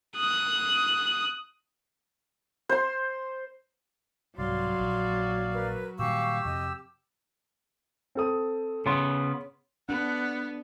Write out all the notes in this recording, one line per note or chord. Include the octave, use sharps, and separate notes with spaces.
D#6 F#6
C5 C6
C2 G#2 B2 F#3 D5 F5 C6
A#1 F3
A#4 B4
A#2 D#3 G3 G4 F5 G#5 C#6 E6
F2 C3 D#5
C4 A4 D#6
C#3 B3 C#5 C6
B3 D4 F#5